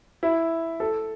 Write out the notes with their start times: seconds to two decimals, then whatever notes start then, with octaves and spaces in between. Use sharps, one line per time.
0.23 E4
0.80 A4